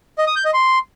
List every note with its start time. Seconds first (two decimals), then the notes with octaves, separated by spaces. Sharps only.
0.18 D#5
0.27 D#6
0.36 G6
0.45 D#5
0.54 C6